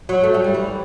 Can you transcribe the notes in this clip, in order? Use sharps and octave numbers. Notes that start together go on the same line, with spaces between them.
F#3
A3
G3
G3
E3